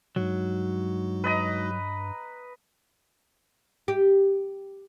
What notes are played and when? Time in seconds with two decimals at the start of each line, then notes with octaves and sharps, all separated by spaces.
0.16 G2 F#3 G#3 D#4 F#4
1.24 B4 D#5 A#5
3.88 G4